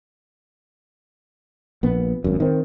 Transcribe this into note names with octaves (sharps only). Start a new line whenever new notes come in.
A#1 B3
G#1 F#2
D#3 C4